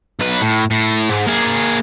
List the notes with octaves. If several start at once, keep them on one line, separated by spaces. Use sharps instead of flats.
B1 B4
A2
A2
G#2
A#3 G#4